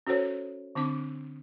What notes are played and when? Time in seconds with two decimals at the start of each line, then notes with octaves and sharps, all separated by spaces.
0.07 C#4 F#4 A4 C5 C#5
0.75 D3 C4 D4 D6